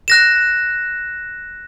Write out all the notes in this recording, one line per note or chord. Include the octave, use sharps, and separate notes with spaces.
F#6 A#6 E7